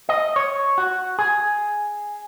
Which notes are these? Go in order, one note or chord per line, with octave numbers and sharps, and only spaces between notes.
D#5
C#5
F#4
G#4